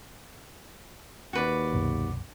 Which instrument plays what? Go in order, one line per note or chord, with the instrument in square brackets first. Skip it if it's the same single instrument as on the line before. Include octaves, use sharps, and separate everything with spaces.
[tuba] D#2 [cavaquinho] F#4 B4 D5
[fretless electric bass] C2 F#2 B2